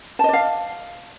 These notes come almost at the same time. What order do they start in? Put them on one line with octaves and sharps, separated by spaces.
A5 D#5 D5 F5